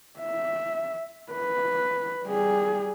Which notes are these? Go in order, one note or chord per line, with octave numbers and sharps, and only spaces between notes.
E5
B4
G3 G#4